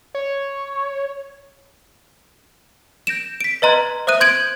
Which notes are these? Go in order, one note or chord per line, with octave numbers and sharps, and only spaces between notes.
C#5
G6 A#6 D7 E7
B6 D7
B4 D#5 A#5 C6 F#6 G#6
C5 E5 D#6 F#6 D#7
C6 G6 G#6 D7 F#7